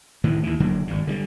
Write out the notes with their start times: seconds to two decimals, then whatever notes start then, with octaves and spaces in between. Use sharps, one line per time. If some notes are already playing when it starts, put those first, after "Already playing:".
0.24 A2 D#3 E3
0.43 D#2 E3
0.60 F#1 D3 F#3 A#3
0.87 G#1 G2
1.07 D3 F3 G3